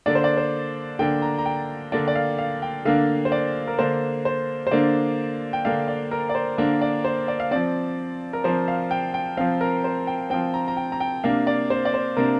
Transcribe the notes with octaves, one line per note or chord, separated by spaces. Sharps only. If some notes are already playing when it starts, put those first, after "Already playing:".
D3 A#3 D4 D5
C5
D5
C5
D3 A#3 D4 G5
A#5
A#5
G5
D3 A#3 D4 D5
D5
F5
F5
G5
D3 A#3 D4 F5
C5
D5
A#4
D3 A#3 D4 C5
C5
C5
D3 A#3 D4 D5
G5
D3 A#3 D4 F5
D5
A#4
D5
C5
D3 A#3 D4 A#4
D5
C5
D5
F5
F3 C4 D5
A#4
F3 C4 C5
F5
G5
G5
F3 C4 F5
A#4
C5
G5
F3 C4 G5
A#5
A#5
G5
A#5
G5
C3 A#3 D4 F5
D5
C5
D5
C5
C3 A#3 D4 A#4